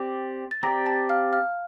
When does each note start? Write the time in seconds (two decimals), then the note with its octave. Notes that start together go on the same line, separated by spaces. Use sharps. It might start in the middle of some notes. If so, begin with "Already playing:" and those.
Already playing: C4 G4 D5
0.51 A6
0.63 C4 G4 D5 A#5 A#6
0.86 A5 A6
1.09 F5 F6
1.33 F5 F6